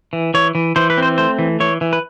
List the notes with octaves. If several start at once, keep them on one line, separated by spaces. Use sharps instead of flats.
E3
E3 C#5
E3
E3 C5
B4
C4 C5
A3 C5
E3
E3 C#5
E3
B4